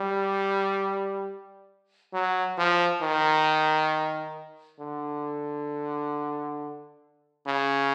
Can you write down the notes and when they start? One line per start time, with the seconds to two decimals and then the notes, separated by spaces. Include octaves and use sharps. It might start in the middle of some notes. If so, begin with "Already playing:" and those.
Already playing: G3
2.13 F#3
2.58 F3
3.02 D#3
4.80 D3
7.46 C#3